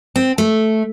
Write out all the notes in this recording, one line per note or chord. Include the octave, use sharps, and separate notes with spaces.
C4
A3